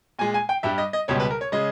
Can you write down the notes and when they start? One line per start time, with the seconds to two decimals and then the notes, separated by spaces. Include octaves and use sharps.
0.19 A#2 G#3 G#5
0.34 G#5
0.49 G5
0.63 G2 G3 E5
0.78 D#5
0.93 D#5
1.08 C#2 B2 G3 C#5
1.20 B4
1.31 A#4
1.41 C#5
1.52 C#3 G#3 D#5